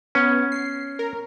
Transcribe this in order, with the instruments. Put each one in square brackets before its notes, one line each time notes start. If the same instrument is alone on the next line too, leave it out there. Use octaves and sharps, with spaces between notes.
[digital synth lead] B3 [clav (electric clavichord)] C#4
[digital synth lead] C7
A#4